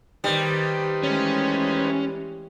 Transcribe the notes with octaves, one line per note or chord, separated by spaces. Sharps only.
D#3 G3 D#4 G4 B4 C5
E3 G#3 A3 C#4